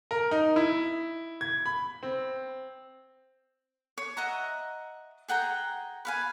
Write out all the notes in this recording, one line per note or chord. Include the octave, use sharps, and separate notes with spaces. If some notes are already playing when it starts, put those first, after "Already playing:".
A#4
D#4
E4
G#6
B5
C4
C#5
D#5 E5 F#5 A#5
G#4 F#5 G5 A#5
B4 F5 G#5